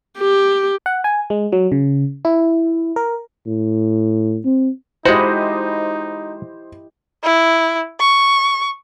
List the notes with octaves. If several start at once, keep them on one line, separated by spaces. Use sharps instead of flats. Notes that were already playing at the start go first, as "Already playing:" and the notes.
G4
F#5
G#5
G#3
F#3
C#3
E4
A#4
A2
C4
G#3 D#4 E4 F#4 G4 C5 D#5
E4
C#6